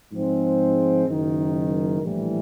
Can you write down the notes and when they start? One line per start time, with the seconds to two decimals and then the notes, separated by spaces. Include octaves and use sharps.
0.12 G#2 F3 G#3 C4
1.06 F#1 F#2 D#3
2.00 A#1 A2 E3 G3